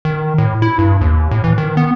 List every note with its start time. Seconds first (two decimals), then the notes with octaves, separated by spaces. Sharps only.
0.05 D#3
0.38 A2
0.62 E4
0.79 G2
1.01 D#2
1.31 A2
1.44 E3
1.58 D#3
1.77 B3